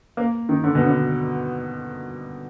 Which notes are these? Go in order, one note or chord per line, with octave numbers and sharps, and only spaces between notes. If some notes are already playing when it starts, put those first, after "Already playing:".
A#3
D#3
D3
B2
D3